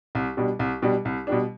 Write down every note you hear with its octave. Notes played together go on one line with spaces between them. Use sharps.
C2
B2 G3 D4
C2
B2 G3 D4
C2
B2 G3 D4